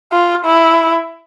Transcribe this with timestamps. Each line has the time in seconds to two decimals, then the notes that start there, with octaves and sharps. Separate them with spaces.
0.12 F4
0.45 E4